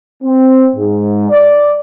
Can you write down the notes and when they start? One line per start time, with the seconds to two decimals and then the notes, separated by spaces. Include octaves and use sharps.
0.23 C4
0.75 G#2
1.30 D5